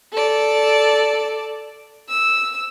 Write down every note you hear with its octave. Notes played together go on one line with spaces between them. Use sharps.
A4 D5
E6